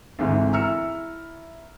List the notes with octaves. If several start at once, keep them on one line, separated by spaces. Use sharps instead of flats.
G#1 D2 G#2 E3
E4 A#5 E6 F6 C#7